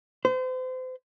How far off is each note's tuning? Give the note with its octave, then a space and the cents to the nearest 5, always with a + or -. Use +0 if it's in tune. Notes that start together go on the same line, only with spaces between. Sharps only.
C5 -35